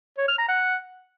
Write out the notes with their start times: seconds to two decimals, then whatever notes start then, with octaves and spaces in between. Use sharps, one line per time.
0.18 C#5
0.28 F6
0.38 A#5
0.48 F#5